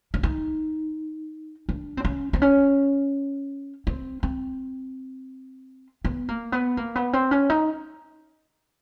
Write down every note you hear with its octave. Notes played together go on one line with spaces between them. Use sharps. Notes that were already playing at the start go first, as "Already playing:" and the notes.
D4
D#4
D4
C4
C#4
C4
C#4
C4
C4
B3
A#3
B3
A#3
B3
C4
C#4
D#4